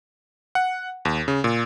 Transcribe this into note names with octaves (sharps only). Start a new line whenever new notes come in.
F#5
D#2
C#3
A#2